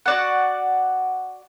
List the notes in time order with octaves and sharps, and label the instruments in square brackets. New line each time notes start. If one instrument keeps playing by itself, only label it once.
[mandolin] F#4 D5 F#5